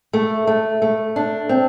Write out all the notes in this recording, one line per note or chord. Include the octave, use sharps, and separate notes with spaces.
A3
A3
A3
D4
C4